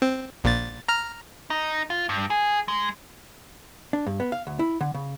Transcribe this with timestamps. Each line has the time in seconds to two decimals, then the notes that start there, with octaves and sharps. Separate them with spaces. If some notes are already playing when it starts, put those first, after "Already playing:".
0.02 C4
0.44 A#1 A#2 A6
0.88 A#5 F6
1.50 D#4
1.90 F4
2.09 G2
2.30 G#4
2.68 G#3
3.93 D4
4.07 G2
4.20 B3
4.32 F5
4.47 D2
4.59 E4
4.81 D3
4.94 C#3